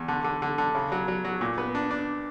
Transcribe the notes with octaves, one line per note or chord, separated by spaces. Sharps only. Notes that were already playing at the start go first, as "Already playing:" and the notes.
Already playing: E2
D3
D3
D3
D3
C#3
F#3
F#3
F#3
A#2
B3
D4
D4